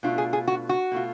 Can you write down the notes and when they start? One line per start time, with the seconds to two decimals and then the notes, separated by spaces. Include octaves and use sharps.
0.03 B2 A3 D4 F4
0.18 G#4
0.33 G#4
0.47 F#4
0.69 F#4
0.92 B2 A3 F4